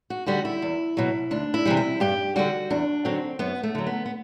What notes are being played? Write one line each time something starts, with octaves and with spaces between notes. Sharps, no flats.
F#4
D3 G3 F#4
E4
E2
B2 F#3
D2 D4
E4
C3 E3 G3
E4
G2 G4
D3 G3 F#4
E2 D4
D3 F#3 C4
F#2 B3
A3
D3 F#3
B3
B3